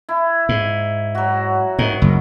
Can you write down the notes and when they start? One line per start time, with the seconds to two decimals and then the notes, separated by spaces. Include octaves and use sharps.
0.09 E4
0.49 G#2
1.15 F#3 F#4
1.79 G#2 D#3
2.02 F#1